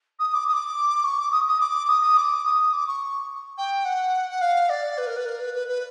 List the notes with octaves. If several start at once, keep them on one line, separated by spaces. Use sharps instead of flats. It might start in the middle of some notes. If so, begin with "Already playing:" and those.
D#6
D6
D#6
D6
C#6
D6
D#6
D#6
D6
D#6
D#6
D6
D#6
D6
C#6
G5
F#5
F#5
F5
D5
B4
A#4
B4
A#4
B4
B4
B4